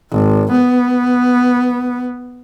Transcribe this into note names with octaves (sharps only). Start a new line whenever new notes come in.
G#1
B3